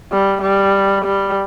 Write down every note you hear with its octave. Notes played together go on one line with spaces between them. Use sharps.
G3
G3
G3